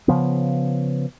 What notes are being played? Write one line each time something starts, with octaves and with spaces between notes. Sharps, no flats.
C#3 F3 B3